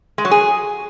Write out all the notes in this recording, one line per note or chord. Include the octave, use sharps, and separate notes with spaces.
G#3
F#3
G#4